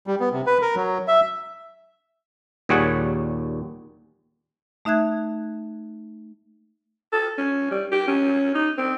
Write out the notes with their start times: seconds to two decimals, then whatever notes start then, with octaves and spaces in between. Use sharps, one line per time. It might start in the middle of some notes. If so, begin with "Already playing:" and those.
0.07 G3
0.20 B3
0.32 C3
0.47 B4
0.62 A#4
0.76 F#3
1.08 E5
2.69 D#2 A#2 G3 G#4 C#5 F#5
4.85 A3 D#4 E5 F#6 G#6
7.12 A4
7.37 C#4
7.71 G3
7.92 G4
8.08 C#4
8.55 D#4
8.78 C4